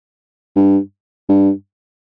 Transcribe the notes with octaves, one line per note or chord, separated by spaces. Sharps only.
G2
G2